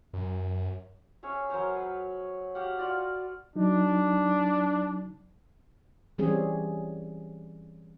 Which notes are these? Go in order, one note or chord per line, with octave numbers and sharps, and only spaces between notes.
F#2
C#4 G#4 C#5 E5
F#3 A#4 C5 C#5
B4
F#4 G4 F5 F#5
F4 F#4 D5
F#3 D4 D#4
E3 G3 C4 C#4 G#4